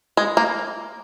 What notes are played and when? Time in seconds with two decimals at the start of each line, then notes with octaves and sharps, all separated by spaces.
0.17 G#3
0.37 A#3